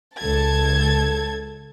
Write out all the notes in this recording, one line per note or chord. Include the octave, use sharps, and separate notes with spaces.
C#2 A4 A5 G#6